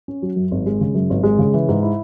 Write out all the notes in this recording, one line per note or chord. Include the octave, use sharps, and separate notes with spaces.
C#4
F#3
F#2
G#1
G#3
C#3
F#2
G#1
G#3
C#3
E3
G#2
E4